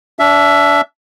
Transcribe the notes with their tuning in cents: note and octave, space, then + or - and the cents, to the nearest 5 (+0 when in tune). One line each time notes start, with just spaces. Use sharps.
D4 -25 E5 +15